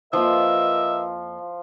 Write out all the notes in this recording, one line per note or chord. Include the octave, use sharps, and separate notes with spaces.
F2 F3 A#3 F4 A#4 B4 D#5 E5